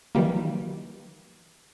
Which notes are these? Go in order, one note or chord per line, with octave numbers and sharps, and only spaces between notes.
D#3 E3 F#3 G3 A#3